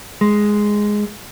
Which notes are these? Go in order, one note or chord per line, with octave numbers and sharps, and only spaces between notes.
G#3